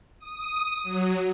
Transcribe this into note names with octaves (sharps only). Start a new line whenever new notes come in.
D#6
F#3